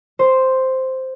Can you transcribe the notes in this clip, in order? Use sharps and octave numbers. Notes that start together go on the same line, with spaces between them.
C5